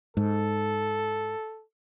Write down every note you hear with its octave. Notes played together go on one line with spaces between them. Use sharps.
G#2 A4